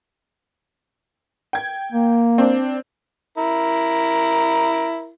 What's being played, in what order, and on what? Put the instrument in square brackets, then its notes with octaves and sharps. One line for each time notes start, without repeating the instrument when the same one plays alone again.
[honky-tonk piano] G5 G#6
[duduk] A#3
[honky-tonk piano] C4 D4
[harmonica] E4 A#4